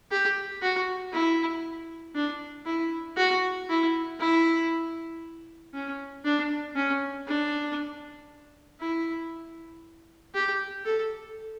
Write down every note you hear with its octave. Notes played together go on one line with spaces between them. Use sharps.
G4
F#4
E4
D4
E4
F#4
E4
E4
C#4
D4
C#4
D4
E4
G4
A4